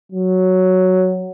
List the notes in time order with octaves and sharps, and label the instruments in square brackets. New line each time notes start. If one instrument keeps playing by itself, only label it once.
[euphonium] F#3